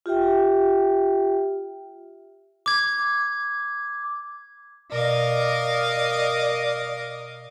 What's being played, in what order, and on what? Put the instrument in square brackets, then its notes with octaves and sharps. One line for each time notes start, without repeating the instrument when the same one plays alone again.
[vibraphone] F4 G4 E5 G5
[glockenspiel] D6 G#6
[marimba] B2 [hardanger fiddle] A#4 F5 [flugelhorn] D5 [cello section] D#5